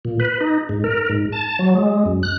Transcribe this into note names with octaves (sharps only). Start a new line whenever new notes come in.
A#2
B4
D#4
G#2
A#4
G#2
A5
F#3
G#3
F#2
F#6